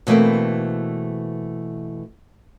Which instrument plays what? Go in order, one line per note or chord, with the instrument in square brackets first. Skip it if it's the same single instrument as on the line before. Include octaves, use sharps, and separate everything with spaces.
[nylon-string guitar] B2 E3 A3 A#3 C4